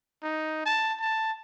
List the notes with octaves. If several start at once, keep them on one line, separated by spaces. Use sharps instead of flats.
D#4
A5
A5